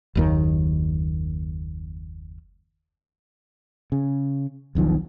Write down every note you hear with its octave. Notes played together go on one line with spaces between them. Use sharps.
F#1 D#2 D#3
C#3
E1 B1 D#3 F3